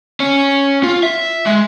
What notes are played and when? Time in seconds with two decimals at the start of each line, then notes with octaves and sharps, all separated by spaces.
0.20 C#4
0.83 F4
1.03 E5
1.46 G#3